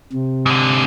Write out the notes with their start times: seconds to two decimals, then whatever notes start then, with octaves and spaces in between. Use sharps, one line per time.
0.13 C3
0.46 G#2 D3